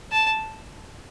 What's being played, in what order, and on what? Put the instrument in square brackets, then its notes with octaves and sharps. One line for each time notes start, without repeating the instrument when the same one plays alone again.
[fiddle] A5